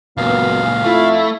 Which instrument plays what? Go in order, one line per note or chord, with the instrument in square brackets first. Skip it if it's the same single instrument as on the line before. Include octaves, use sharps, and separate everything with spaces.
[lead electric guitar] C#2 A#2 [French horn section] F#3 A#3 B3 [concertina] F5
[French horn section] F2 F4 [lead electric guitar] A3 [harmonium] E4